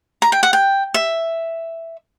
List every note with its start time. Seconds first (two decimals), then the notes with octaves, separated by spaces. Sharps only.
0.22 A#5
0.32 G5
0.43 F#5
0.53 G5
0.94 E5